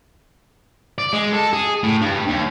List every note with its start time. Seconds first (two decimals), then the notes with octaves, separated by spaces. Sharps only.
0.98 D5
1.13 G#3
1.33 A4
1.53 G#4
1.83 A2
2.01 G2
2.28 D#2